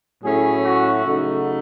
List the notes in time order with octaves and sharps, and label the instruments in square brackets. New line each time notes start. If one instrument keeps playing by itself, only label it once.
[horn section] A2 F#3 A3 C#4 E4 G#4
F#4
C#3 F#3 A3 D#4